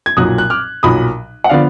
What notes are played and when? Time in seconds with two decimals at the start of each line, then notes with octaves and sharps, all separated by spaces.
0.06 G#6
0.17 B1 A#2 F#3 D#6 F#6
0.38 F#6
0.50 D6 F6
0.83 B1 A#2 F#3 B5 D#6
1.44 F#5
1.49 D3 F3 B3 D5 F5